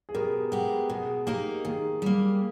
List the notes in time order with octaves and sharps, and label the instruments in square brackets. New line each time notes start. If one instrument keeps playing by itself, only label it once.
[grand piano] G#4
[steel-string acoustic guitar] B2 [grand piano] G4 A#4
[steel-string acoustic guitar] G#3 B3 G4
[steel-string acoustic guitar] B2 [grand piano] G#4
[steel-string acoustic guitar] A#3 D#4 A#4 [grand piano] G4
[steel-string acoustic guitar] D#3 [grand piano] G#4
[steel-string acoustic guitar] G3 A#3